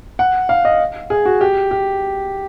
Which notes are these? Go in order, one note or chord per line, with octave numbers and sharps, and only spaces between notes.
F#5
F5
D#5
G#4
F#4
G4
G4